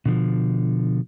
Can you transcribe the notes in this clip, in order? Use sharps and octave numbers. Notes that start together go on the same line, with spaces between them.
B2 D3 F3